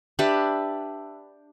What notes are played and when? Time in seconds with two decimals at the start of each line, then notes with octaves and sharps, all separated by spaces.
0.19 D4 G4 B4 E5